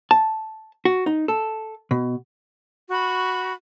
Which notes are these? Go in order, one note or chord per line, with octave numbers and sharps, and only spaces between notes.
A5
F#4
D#4
A4
B2
F#4 B5 C#6